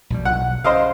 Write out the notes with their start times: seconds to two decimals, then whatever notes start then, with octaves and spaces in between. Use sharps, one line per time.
0.10 A#1 B2 G3
0.25 B1 F#5
0.64 C#3 C5 D#5 F5